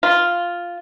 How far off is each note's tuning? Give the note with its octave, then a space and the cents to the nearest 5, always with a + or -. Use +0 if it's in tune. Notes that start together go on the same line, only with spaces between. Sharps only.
F4 +0